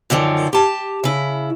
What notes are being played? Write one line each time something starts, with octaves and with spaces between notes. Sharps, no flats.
F#2 D3 D#3 F3
G4 A5
C#3 E4